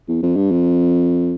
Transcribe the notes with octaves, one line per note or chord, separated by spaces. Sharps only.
E2
F2
G2
F2